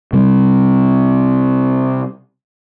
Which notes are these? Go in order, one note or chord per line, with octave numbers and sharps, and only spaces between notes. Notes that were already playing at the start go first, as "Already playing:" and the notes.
C3 G3